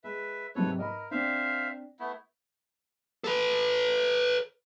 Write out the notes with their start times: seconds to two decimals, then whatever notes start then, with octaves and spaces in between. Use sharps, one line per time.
0.04 G#3 B4 E5
0.55 G#2 C3 F#3 A4 B4 C#5
0.79 A#4 D#5 B5
1.11 C4 D4 C5 E5 F5
2.00 A3 B3 E4
3.24 A4 B4